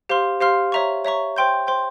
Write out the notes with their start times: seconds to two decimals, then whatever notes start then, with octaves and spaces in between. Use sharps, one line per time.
0.09 G4 C5 F5 C6 F6
0.40 G4 C5 F5 C6 F6
0.72 C#5 E5 A#5 C#6
1.05 C#5 E5 A#5 C#6
1.36 C5 G5 C6 G6
1.67 C5 G5 C6 G6